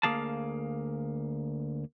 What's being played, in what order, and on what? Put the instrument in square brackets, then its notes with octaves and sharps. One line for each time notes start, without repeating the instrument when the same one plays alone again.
[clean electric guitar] D2 A#3 G#4 F5 A5